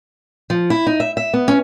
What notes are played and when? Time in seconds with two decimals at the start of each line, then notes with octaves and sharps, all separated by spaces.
0.50 F3
0.70 E4
0.87 D#4
1.00 E5
1.17 E5
1.33 B3
1.48 C#4